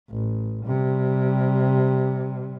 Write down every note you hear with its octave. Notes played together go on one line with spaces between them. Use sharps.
A1
C3 G3